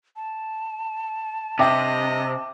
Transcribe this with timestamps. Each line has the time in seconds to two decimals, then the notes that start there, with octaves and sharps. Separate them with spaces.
0.16 A5
1.59 G2 C3 D#5 E5 G5 D6